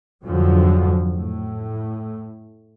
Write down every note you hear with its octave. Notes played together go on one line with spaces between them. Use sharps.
F2 G#2 D3 F3 F#3
A2